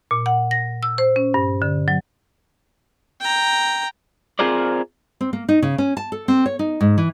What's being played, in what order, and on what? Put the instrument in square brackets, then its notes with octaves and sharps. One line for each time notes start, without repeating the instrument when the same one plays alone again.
[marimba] A#2
F#5
A#6
E6
C5
C#4
G2
D3
F#3
[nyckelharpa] G5 A#5
[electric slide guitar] C4 F4 G#4 A#4 C5 D5
[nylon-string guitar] C4
A#3
D#4
C#3
C#4
A5
A4
C4
C#5
D#4
G#2
E3